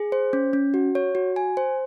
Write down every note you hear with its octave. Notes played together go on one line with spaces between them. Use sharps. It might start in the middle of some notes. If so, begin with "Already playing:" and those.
Already playing: G#4
C5
C#4
C#4
F#4
C#5
F#4
G#5
C5